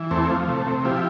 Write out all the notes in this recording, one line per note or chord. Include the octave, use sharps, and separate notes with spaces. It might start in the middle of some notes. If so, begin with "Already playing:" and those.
Already playing: E3
E2 A3 C4
F3
C3 A3
C3
F3 E4 G4